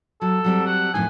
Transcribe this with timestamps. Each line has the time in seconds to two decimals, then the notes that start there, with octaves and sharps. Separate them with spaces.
0.21 F#3 A4
0.44 F#3 G3 C4
0.66 F#5
0.94 F2 A2 D#3 G#5